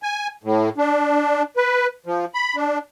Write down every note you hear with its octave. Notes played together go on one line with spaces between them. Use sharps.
G#5
A2
D4
B4
F3
B5
D4